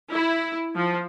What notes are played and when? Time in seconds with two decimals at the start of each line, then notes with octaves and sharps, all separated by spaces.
0.11 E4
0.75 F3